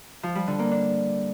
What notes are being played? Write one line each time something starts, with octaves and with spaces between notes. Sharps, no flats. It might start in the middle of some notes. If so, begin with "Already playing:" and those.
F3
G3
D3
A#3
D4